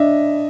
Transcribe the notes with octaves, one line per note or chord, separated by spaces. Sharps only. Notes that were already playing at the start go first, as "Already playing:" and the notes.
Already playing: D4 D#5 E5